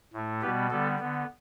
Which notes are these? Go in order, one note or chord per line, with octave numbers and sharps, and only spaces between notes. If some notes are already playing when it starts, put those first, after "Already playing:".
A2 A3
B2 G3 B3 G4 B4
D3 G3 B3 A4
D3 B3